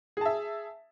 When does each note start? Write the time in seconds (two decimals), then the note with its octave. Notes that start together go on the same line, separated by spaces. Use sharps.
0.17 G#4
0.21 A5
0.25 E5